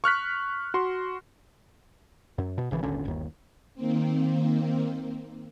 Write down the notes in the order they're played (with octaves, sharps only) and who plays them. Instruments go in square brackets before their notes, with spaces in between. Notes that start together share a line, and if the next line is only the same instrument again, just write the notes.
[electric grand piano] C#6 F6 F#6 B6
F#4 C6
[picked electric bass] F#2
B2
G#1 C#3 E3
D#1 G#1 D3 C#4
G1 D#2
[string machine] D#3 A#3 C4